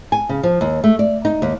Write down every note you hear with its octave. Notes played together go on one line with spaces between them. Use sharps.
G#5
C#3
F3
D#2
A3
D5
D#4
D#2